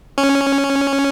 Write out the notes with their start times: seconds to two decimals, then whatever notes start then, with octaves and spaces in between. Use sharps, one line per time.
0.18 C#4